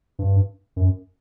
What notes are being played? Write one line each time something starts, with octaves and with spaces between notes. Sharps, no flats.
G2
F#2